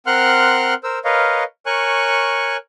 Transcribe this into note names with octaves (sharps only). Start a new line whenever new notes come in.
C4 A#4 F#5 C6 F6 F#6
A#4 C5 E6
A#4 B4 C#5 D#5 F5
A#4 C#5 G#5 C#6 F#6